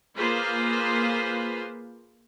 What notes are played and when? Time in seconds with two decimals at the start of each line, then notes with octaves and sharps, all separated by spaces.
0.16 A#3 F4 G#4 B4 C5